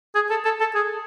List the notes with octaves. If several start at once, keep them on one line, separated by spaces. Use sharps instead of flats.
G#4
A4
A4
A4
G#4